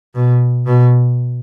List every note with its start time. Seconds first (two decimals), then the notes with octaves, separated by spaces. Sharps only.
0.15 B2
0.66 B2